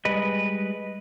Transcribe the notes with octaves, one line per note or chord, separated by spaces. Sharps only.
G3 G#3 B4 D#5